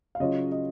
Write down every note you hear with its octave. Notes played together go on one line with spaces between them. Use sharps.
F5
C#3 F#3 C#4 F4 D#5
D#5